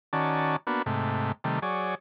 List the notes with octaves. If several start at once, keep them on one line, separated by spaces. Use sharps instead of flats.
D#3 C#4 F#4 D5 A5
A#3 B3 D4 F#4
G#2 C3 A3
C3 D#3 G3 A3
F#3 G#4 C#5 D5